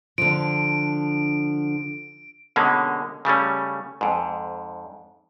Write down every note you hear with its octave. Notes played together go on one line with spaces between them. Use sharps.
D3 F3 D7
B2 D3 G#3 A#3 C#4
C#3 G3 A3 C#4
F2 G#2